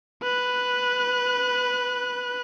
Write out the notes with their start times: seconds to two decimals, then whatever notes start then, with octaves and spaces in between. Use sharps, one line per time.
0.22 B4 F#6